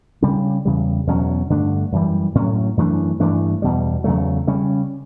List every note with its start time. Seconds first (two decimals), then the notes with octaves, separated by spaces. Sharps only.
0.22 C#3 G3 C#4
0.65 E2 C#3 G3
1.07 E2 B2 F#3 C#4
1.50 G2 D3 A3 D4
1.92 F#2 E3 G3
2.35 A2 F#3 C#4
2.77 F#2 E3 A3 D4
3.20 G2 E3 A3 D4
3.62 E2 B2 G3
4.04 E2 C#3 F#3 A3
4.47 C#3 G3 C#4